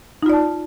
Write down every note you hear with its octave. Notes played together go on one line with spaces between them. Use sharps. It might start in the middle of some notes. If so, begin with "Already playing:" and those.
D#4 F4 D5 A5